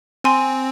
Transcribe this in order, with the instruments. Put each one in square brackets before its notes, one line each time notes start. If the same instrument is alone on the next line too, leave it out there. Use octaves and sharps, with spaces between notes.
[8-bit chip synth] C4 [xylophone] G#5 C6